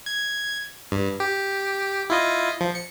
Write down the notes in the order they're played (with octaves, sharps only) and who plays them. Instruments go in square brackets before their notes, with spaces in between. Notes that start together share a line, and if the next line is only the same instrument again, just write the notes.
[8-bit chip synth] G#6
G2
G4
E4 F4 D#5
F3
C#7